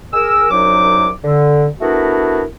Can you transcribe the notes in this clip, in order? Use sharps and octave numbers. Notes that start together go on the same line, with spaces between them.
G#4 A#4 E6
C2 F#2 F#3 D#4 D6
D3
A3 B3 D4 E4 F#4 A#4